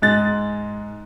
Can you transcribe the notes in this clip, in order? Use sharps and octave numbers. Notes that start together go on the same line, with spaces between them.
G#2 G#3 F#6 A6